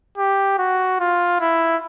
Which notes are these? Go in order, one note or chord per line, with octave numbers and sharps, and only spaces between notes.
G4
F#4
F4
E4